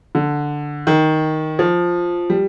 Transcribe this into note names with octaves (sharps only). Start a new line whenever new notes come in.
D3
D#3
F3
G3